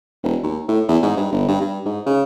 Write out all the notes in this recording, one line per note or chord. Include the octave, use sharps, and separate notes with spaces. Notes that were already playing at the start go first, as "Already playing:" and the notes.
E1
D#2
A2
E2
G#2
G2
G1
G2
G2
G#2
C#3